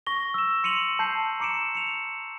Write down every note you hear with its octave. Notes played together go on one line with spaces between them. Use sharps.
C#6 A#6 G7
E6 E7
C6 C#7 D#7 F7 F#7
A5 G6 C7
A#5 D6 C#7 D7 E7
C#7 F7